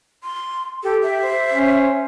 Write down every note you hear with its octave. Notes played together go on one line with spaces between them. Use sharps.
C6
G4 A4
E5
C5
C#4